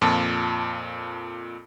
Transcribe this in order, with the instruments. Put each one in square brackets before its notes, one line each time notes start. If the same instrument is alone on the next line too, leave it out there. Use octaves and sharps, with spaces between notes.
[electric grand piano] F2 A#2 A5